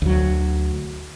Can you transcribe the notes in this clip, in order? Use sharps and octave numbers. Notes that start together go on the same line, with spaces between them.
D2 F#3